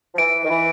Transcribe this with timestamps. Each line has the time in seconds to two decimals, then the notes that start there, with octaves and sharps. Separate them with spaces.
0.15 F3
0.18 E3 D7
0.45 D#3
0.50 E3